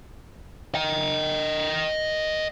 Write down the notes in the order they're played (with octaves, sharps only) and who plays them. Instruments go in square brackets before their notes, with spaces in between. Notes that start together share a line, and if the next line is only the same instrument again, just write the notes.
[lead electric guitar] D#5 G5